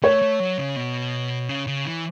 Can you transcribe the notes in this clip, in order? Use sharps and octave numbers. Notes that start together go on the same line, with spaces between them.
A3 C#5
A3
F#3
C#3
B2
C#3
C#3
E3